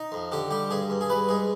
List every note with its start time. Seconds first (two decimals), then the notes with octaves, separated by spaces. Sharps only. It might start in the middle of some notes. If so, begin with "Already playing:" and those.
Already playing: D#4
0.12 F2
0.32 D3 G4
0.50 G3 G4
0.71 G2 G#4
0.90 G2
1.01 G#4
1.10 G3 B4
1.29 G#2 G#4